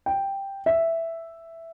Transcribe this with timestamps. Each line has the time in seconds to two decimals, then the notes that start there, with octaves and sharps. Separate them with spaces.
0.06 G5
0.66 E5